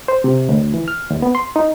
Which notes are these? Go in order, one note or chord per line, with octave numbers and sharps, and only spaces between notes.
C5
C3
D2
E3
F6
D#2
B3
C6
D#4